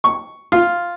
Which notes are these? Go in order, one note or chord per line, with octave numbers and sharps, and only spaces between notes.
C#6
F4